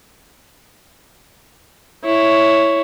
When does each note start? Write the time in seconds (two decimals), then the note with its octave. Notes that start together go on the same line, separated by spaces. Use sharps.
2.05 E4 C#5